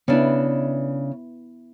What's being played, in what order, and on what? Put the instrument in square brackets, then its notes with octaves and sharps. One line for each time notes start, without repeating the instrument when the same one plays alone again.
[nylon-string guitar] C#3 D4 [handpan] B3 E4